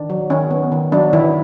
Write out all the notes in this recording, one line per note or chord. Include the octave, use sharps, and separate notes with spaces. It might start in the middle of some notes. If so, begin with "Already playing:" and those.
Already playing: D#3 D4
F#3
D#3 C#4
B3
D#3
F#3 D4
D#3 E3 E4